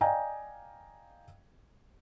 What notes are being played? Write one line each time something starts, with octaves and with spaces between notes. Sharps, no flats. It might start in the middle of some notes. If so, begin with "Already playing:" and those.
D5 D#5 F5 G5 G#5 A#5